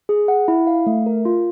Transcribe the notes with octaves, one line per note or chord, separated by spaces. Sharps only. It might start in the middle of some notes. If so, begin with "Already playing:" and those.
G#4
F#5
E4
F5
A3
A#4
F4